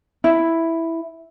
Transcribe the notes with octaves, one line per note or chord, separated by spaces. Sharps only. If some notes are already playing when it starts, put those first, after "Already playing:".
E4